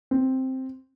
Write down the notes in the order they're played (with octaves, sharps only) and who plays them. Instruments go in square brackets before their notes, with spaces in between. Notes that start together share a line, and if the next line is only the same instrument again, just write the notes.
[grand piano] C4